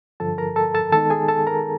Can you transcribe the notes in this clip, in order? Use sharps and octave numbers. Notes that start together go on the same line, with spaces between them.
G2 D3 F3 A4 A5
A#4 A#5
A4 A5
A4 A5
D#3 G#3 B3 D#4 A4 A5
G#4 G#5
A4 A5
A#4 A#5